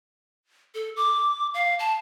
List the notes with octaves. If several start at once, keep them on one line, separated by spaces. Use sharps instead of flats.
A4
D6
F5
A5